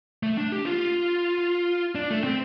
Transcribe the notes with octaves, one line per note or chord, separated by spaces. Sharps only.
A3
D4
G4
F4
D4
A3
C4